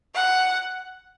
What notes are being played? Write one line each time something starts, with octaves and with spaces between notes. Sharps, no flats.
F#5